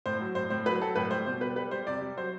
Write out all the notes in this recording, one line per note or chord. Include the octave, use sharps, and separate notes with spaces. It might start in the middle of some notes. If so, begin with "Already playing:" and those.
A2 C5
F#3
A2 C5
A2 C5
F#3 B4
F#3 A4
A2 B4
G3 C5
B2 C5
G3 B4
G3 B4
G3 C5
C3 D5
G3
F#3 C5